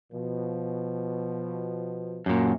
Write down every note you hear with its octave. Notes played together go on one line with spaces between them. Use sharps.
B2 F3
F#2 A#2